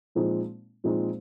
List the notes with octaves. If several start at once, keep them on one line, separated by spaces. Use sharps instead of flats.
A#2 F3 G#3 C4 D#4
A#2 F3 G#3 C4 D#4